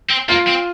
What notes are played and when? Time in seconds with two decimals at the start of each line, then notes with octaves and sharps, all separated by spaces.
0.10 C4
0.29 A#3 F4
0.47 C4